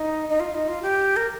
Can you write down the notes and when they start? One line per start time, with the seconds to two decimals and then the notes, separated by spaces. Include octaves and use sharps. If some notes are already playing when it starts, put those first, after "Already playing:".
Already playing: D#4
0.29 D#4
0.40 F4
0.54 D#4
0.68 F4
0.82 G4
1.16 A#4